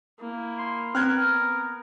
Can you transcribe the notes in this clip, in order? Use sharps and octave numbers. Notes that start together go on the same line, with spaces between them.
A#3 E4
C6
B3 C4 A#4 F6 F#6 G#6